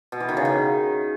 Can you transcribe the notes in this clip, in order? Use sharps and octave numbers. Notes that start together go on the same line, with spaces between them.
B2
E3
D#3
C#3
D#3